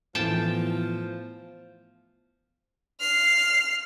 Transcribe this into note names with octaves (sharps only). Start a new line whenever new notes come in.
A2 E3 F3 B3 G5 A5
F6 C7